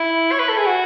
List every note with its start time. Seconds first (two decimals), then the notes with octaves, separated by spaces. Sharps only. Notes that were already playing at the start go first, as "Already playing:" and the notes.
Already playing: E4
0.32 C#5
0.40 B4
0.49 A4
0.57 G#4
0.66 F#4